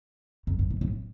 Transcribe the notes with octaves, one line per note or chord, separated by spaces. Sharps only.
F2
G2
A2
A2